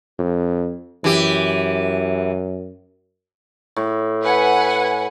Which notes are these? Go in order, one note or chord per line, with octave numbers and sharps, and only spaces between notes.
F2
F#2 E3 G4
A2
B4 F#5 G#5